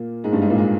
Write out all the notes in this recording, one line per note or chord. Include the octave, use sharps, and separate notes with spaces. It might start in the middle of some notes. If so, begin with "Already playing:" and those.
Already playing: A#2 A#3
G#2 G#3
G2 G3
G#2 G#3
A#2 A#3
G#3